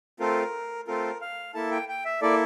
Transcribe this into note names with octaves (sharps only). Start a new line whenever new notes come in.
A3 C4 F4 A4 A#4
A3 C4 F4 A4 A#4
F5
A#3 E4 A4 A5
G5
G5
E5
A#3 E4 A4 D5